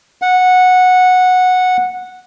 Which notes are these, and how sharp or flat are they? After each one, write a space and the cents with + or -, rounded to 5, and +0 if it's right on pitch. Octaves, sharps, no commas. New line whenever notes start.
F#5 -10